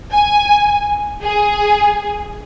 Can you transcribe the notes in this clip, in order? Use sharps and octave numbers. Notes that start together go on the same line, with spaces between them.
G#5
G#4